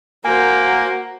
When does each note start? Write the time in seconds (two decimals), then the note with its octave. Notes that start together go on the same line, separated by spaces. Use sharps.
0.25 A#3 F#4 A#4 C5 G#5 G6